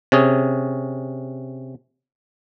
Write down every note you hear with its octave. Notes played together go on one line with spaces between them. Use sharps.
C3 C#4 G#4